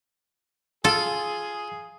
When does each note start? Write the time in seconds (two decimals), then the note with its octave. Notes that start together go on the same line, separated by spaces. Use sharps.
0.84 F4 G#4 A4 F5